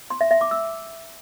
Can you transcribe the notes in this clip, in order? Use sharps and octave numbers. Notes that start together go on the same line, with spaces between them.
C6
E5
E5
D6
E6